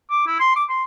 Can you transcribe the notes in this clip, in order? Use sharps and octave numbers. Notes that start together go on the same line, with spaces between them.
D6
E4
C6
D6
C6